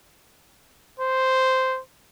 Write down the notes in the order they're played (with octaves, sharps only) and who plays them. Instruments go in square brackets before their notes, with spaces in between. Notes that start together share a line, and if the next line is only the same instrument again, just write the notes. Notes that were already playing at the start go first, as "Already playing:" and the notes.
[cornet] C5